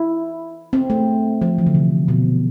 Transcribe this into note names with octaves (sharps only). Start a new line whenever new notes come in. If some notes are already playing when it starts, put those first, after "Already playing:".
Already playing: E4
C4
A3
F3
E3
D3
C3
B2